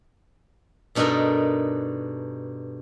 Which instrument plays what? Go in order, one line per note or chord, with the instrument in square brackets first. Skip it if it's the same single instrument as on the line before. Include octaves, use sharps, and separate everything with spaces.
[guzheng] G2 B2 D4 D#4 A4 A#4